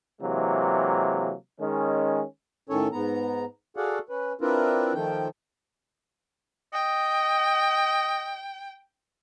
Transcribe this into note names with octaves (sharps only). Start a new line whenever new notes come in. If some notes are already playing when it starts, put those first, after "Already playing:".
C3 E3 F#3 G#3 A#3
D#3 G#3 C#4
A2 D#3 C#4 A4 C#5
G#2 B3 A#5
F#4 G#4 A4 D5 F5 F#5
C#4 B4
C4 D4 E4 F4 A#4 B4
D#3 F3 A3 G5
D#5 G5